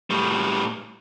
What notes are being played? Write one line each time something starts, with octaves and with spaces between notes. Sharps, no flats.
A2 G3